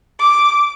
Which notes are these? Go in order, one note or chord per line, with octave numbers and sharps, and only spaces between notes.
D6